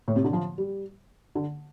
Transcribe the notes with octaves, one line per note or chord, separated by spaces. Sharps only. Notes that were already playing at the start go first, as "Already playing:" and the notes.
A2
C3
D3
F3
G3
D3